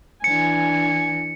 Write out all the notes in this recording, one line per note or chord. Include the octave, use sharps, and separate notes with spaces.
E3 D4 G#5 C#7